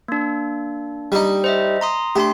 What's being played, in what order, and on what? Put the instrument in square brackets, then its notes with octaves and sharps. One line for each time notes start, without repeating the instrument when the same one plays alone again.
[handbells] A#3 D4
[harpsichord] G3 D#4
[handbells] C5 D#5 E5
A#5 C6 D#6
[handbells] A3 D4 C6 [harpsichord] G4